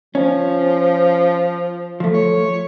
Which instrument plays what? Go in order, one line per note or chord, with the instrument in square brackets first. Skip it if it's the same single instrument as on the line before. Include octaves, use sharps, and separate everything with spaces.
[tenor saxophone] F3 [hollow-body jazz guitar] C#4
[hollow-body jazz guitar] F3 A3
[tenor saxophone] C#5